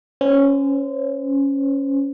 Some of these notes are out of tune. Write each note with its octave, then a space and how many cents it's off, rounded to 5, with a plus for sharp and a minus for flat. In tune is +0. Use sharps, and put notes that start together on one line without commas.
C#4 -5 C5 -30